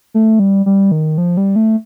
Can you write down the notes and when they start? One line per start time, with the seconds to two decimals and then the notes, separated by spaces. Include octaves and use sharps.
0.14 A3
0.39 G3
0.66 G3
0.92 D#3
1.18 F3
1.37 G3
1.56 A3